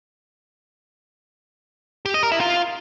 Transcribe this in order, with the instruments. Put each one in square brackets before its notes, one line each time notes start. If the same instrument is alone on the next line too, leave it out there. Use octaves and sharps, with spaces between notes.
[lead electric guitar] G4
D#5
A#4
E4
F4